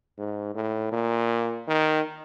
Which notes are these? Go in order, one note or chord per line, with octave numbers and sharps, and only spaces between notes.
G#2
A2
A#2
D#3